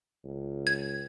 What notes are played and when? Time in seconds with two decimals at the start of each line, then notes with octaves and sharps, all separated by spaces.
0.25 C#2
0.67 G#6